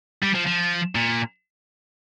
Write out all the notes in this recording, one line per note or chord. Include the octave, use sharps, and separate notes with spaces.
G3
F3
F3
A#2